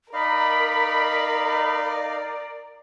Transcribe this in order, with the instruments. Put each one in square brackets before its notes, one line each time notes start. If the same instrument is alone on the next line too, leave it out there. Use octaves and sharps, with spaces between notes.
[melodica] D#4 D#5 F5 [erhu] A#4 [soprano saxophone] D5 [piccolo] B5